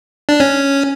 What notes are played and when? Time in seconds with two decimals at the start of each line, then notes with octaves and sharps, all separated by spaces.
0.29 D4
0.40 C#4